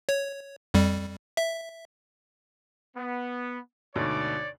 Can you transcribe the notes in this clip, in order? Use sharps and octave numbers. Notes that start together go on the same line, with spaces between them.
C#5
F2 G3
E5
B3
D2 G#2 B2 C#5 D5